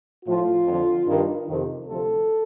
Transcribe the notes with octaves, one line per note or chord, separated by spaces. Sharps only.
A2 F3 F4
F2 D3 F3
G2 D#3
F2 C3 D#3
D2 C3 F3 A4